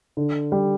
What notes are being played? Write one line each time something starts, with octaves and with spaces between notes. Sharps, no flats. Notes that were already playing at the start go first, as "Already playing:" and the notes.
D3
G3